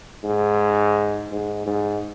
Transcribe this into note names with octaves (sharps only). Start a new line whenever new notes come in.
G#2
G#2
G#2